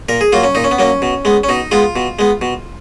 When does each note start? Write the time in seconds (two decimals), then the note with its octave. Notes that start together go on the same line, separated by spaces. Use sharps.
0.09 A#2 A#4
0.21 G#4
0.32 F#3 A#3 F4
0.44 C#4
0.55 A#2 D#4
0.64 C#4
0.71 B3
0.79 F#3 A#3 C#4
1.02 B2
1.25 G#3 B3
1.44 C#4
1.49 B2 D#4
1.71 G#3 B3 F4
1.96 B2
2.19 G#3 B3
2.41 B2